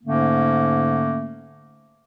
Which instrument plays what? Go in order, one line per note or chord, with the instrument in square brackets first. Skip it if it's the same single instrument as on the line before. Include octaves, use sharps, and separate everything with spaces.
[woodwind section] G#2 D3 A3 A#3 C#4